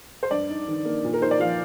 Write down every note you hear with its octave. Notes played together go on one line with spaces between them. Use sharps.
C5
G2 D5
D#4
D#3
A#3
A#2
A#4
D#4 C5
D5
F3 F5